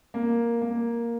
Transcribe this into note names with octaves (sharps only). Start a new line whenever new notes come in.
A#3
A#3